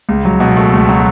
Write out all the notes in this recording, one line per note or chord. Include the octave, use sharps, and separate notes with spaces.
C#2
F#3
B2
A3
C#2
F#3